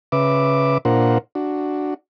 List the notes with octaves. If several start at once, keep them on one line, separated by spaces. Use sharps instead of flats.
C#3 B4 E5 D6
A#2 D4 F4 A#4 C5 F#5
D4 F#4